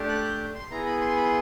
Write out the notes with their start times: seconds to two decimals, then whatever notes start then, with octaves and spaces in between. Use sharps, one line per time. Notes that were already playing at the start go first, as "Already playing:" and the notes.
Already playing: A3 D4 G4
0.09 F#6
0.24 G6
0.55 C6
0.70 B3 E4 G#4 A#5
0.86 B5
1.01 C6
1.17 B5
1.24 C6